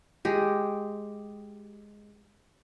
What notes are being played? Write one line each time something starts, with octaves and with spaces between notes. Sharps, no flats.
G#3 G4